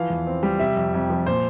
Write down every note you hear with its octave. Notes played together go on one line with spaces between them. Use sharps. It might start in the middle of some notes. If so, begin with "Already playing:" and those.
Already playing: E3 F3 F5
E2
C4
G3
C3 E5
F2
F2
F3
A#2 C5